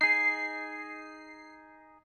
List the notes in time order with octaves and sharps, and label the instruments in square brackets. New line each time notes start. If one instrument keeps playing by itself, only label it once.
[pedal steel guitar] D#4 G#4 [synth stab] C7